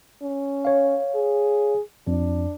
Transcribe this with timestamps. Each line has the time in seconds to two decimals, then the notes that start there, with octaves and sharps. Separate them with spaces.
0.22 C#4
0.65 C#5 F5
1.15 G#4
2.07 F2 D4